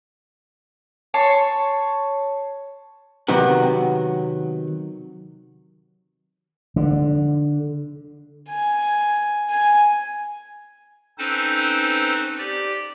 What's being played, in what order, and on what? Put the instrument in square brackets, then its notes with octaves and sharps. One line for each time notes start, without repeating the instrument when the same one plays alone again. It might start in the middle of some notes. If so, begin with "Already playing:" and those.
[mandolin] C#5 A5 C6 C#6
[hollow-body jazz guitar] C3 D#3 F#3 B3 F#4
[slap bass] D3
[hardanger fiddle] G#5
G#5
[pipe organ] C4 C#4 D#4 A4 B4 C5
G4 D5